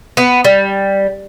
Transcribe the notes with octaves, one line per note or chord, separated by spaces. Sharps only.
B3
G3